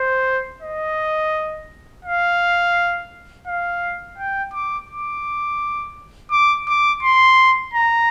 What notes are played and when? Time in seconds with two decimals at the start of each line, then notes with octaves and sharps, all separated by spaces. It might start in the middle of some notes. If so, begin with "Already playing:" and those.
Already playing: C5
0.61 D#5
2.05 F5
3.47 F5
4.18 G5
4.53 D6
4.89 D6
6.31 D6
6.68 D6
7.03 C6
7.74 A#5